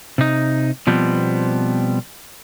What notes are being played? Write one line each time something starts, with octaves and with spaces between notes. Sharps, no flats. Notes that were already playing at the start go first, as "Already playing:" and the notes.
C3 D#4
B2 F3 G3 B3 C4